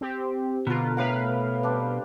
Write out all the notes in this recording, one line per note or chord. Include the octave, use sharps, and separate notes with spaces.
C4 G4
B2 D3 F4 A#4 B4
A2 B4 F5 G5 A#5
G3 C4 D4